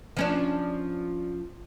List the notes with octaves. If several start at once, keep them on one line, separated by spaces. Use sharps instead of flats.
F3 C#4 D4